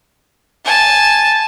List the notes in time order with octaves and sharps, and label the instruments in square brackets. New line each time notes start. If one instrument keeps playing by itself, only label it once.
[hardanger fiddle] G#5 A5